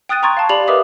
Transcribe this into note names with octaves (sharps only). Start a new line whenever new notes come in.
G5 D#6 F#6 A6 D#7
G5 A#5 C6 C#6 G#6 A6
F5 A5
G4 D5 F5 B5 F7 F#7
A#4 B4 D#5 E5 D6 D#6